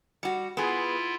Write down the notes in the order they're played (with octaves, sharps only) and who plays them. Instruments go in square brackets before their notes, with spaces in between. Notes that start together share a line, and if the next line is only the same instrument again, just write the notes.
[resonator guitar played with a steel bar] G3 F#4
[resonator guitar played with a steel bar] B3 G#4 [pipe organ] E4 F4